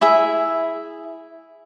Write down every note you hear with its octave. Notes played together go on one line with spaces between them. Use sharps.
E4 G#4 E5